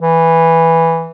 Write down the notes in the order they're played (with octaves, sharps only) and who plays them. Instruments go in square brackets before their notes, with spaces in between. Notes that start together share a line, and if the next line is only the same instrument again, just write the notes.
[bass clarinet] E3